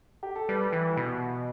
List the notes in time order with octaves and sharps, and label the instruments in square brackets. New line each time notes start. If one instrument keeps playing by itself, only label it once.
[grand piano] G4
A4
[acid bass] G3 [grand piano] B4
[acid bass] E3
B2